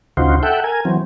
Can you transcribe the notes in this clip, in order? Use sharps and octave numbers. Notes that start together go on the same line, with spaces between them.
D2 C#3 D#4 F4 F#4 C5
A4 E5 F#5 G5
A#4 G#5
E3 F#3 C4